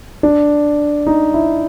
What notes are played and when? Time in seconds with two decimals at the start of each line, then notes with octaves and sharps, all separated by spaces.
0.23 D4
1.07 D#4
1.34 E4